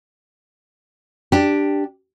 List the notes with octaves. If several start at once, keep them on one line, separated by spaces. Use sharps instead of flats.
D4 G4